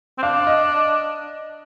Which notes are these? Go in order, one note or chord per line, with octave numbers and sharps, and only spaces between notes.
C4
D4 F5
D#5